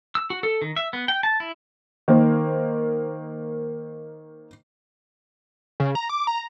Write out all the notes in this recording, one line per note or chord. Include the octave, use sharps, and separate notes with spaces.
E6
F#4
A4
D#3
E5
B3
G5
A5
E4
D#3 A#3 C5
C#3
A#5
D6
A#5